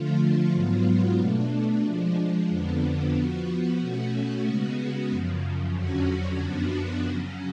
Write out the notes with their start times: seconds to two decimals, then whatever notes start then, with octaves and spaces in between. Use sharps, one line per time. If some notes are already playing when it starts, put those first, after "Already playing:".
Already playing: D3 F3 A3 F4
0.53 G#2 F#3 B3 F4
1.18 B2 A3 D4
1.84 F3 G#3 D4
2.49 F2 D3 F3 B3 D4
3.14 F3 B3 F#4
3.79 B2 A3 C#4 F#4
4.45 C#3 G#3 B3 F#4
5.09 F#2 C#3 F3
5.75 F2 D3 F#3 C#4 F#4
6.41 F#2 F3 B3 D4 F#4
7.06 C#3 F#3 C#4